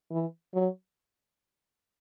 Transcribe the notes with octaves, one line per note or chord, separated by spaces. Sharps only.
E3
F#3